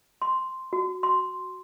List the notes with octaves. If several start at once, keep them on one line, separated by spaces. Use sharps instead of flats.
C6
F#4
C6